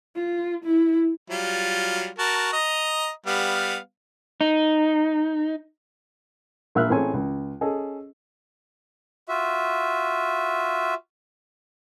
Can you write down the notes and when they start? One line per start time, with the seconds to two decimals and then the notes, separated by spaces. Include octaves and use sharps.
0.15 F4
0.65 E4
1.30 F#3 G3 F4
2.19 F#4 A#4 A5
2.53 D#5 A#5
3.27 G3 B3 F5
4.41 D#4
6.75 A#1 A#3 E5 F6 F#6
6.90 A1 A3 C4 G#4 C#5 G#5
7.14 C#2
7.61 C#4 G#4 A4 D#5
9.29 F4 F#4 E5